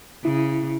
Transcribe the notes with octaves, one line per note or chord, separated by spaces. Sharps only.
C#3 E4